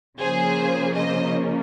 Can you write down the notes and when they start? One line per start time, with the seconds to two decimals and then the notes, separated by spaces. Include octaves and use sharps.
0.20 C#3 F3 A#3 C#4 G#4 C5
0.96 C5 D#5